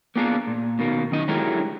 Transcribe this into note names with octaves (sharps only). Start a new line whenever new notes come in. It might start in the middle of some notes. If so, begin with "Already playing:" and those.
A#3 B3 D4 F4 G#4 A#4
A#2
B2 D#3 A#3
F#2 D#3 D#5
D3 F#3 G#3 E4 G4 A#4